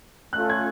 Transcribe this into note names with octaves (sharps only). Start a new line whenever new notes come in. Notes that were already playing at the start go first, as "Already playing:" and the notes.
A3 C#4 F4 A4 F#6
G#6